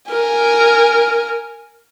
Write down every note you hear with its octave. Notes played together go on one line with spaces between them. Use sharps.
A#4 G#5